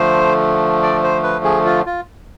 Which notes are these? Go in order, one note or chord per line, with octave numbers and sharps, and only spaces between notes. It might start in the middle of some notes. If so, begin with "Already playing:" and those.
Already playing: D3 F3 A3 C5
D5
C5
B4
G#4
F4
F4